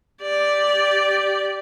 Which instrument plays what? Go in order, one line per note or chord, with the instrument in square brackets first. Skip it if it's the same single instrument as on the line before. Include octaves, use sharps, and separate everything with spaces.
[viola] G4 D5